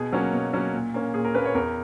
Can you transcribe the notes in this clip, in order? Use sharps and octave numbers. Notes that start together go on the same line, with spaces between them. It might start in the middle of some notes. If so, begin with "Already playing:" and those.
Already playing: B2 G#4
F#3 A#3 C#4
B2
F#3 A#3 C#4
A#2
A#3 C#4
A#2 G#4
A#4
A#3 C#4 B4
C#5
E2 A#4